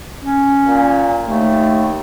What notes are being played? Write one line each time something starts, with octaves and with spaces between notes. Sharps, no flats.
C#4
A#2
D#2 A3